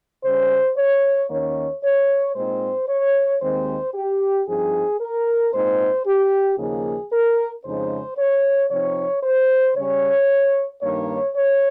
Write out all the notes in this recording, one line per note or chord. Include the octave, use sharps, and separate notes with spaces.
C#3 G3 C#4 C5
C#5
D#2 D#3 A#3 C#4 C#5
C#5
A#2 G#3 C4 D#4 C5
C#5
D#2 D#3 G#3 C4 C5
G4
G2 F3 C4 D#4 G#4
A#4
A#2 G#3 C4 D#4 C5
G4
D#2 C#3 F3 A#3 D#4 G#4
A#4
F2 C#3 G#3 D#4 C5
C#5
C3 F3 C4 D#4 C#5
C5
C#3 G3 C#4 C#5
G2 D#3 A#3 D#4 C#5
C#5